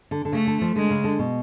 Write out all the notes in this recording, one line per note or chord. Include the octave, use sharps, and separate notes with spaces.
D3
D3
C#3 A3
D3
F3
D3 G#3
C#3
D3
B2